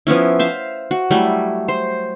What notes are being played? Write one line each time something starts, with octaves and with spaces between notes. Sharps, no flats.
F3 B3 C#4 E4
C5 E5 F5
F#4
F#3 G3 A3 E4
C5